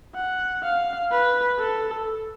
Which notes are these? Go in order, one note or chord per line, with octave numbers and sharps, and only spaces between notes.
F#5
F5
B4
A4